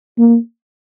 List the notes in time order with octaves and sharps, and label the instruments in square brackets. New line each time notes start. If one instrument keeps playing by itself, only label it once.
[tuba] A#3